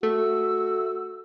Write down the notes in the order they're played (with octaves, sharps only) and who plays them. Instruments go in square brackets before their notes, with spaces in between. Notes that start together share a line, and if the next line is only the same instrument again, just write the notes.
[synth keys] A3 [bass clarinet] F#4 [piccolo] E6